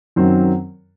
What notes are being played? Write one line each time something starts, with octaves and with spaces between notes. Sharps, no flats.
F#2 D#3 F#3 C4